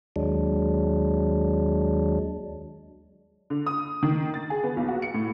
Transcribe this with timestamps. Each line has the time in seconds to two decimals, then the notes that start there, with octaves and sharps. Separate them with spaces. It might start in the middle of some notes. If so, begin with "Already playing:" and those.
0.16 D#2 F#3 G#3 D4
3.50 D3
3.66 D#6
4.03 D#3
4.34 A6
4.50 G#4
4.64 B3
4.77 B1
4.88 F#4
5.02 C#7
5.14 A2